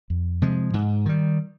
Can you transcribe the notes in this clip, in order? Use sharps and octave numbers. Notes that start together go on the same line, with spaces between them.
F2
C3 F3 G#3
G#2
D#3 G3